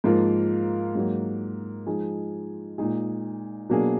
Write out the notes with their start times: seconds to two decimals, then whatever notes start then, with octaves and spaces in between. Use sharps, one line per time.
0.04 G#2 F3 A#3 F4 A#4
0.95 G#2 F#3 A#3
1.86 F3 G#3 D#4 G#4
2.78 A#2 G#3 D#4 G#4
3.69 B2 F#3 A#3 D4 G#4